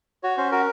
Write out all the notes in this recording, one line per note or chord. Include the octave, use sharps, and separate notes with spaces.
F#4 C#5
C#4 C5
F#4 A#4